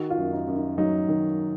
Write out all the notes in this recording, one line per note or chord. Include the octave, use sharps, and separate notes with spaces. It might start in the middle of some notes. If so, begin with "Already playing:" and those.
Already playing: D#3 F#4
F4
F#2
D#4
F#2
D#4
F#3 D#4
D#3